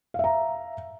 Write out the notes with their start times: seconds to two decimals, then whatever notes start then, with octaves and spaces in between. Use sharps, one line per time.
0.14 F5
0.19 E5
0.24 A#5